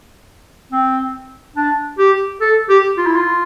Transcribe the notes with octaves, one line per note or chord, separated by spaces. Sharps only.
C4
D4
G4
A4
G4
F4
E4
F4